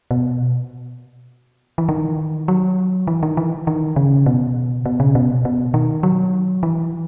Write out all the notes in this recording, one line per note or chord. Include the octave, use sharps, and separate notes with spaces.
B2
E3
D#3
F#3
E3
D#3
E3
D#3
C#3
B2
B2
C#3
B2
B2
D#3
F#3
E3